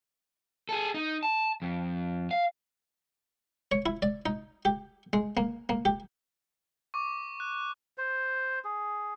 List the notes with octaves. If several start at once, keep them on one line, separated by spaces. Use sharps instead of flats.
G#4 A4
D#4
A5
F2
F5
C#5
E4
D5
D#4
G4
G#3
A#3
A#3
G4
C#6 D6
F#6
C5
G#4